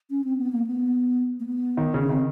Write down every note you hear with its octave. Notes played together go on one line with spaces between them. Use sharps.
C#4
C4
B3
A#3
B3
A#3
B3
D#3
C#3
C#4
D#3 C4